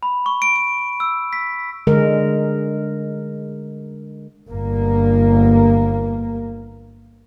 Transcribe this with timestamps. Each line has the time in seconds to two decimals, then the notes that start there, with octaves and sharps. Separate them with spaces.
0.03 B5
0.26 C#6
0.42 D7
0.56 D7
1.00 E6
1.33 B6
1.87 D3 G#3 A#4
4.49 G1 A#3